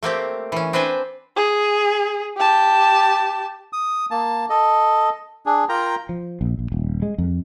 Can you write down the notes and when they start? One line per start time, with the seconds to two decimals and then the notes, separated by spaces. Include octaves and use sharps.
0.03 A3 A#3 C4 G4
0.52 E3 C#4
0.73 C4 D4 B4 C5 G#5
1.37 G#4
2.37 G4 A5
3.73 D#6
4.11 A#3 A5
4.50 A4 D#5
5.46 D4 G#4
5.69 F4 A#4 G5 A#5
6.09 F3
6.41 A#1
6.59 A#1
6.72 D#1
7.02 G#3
7.18 F2